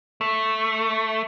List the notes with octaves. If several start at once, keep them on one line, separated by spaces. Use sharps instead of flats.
A3